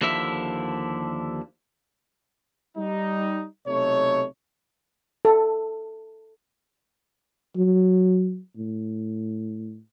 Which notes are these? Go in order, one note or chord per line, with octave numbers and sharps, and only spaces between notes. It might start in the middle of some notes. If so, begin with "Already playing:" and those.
D#2 D3 F3 E4 E5
G3 D#4
B1 C3 A3 D#4 C#5
A4
F#3
A2